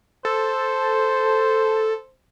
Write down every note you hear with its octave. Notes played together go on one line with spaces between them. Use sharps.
A4 C5